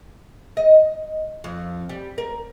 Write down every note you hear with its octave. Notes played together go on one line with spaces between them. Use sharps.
D#5
F2
G3
A#4